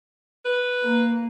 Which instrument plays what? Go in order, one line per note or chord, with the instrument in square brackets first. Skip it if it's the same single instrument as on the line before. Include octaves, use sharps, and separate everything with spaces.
[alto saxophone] B4
[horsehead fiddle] A#3